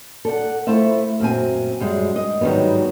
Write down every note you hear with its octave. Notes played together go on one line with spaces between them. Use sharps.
A4 D5 F#5
A3 E4 F4 C5 E5
F#2 A#2 C4 G#5
F#2 G3 G#3
D#5
G#2 D#3 F#3 G3 B3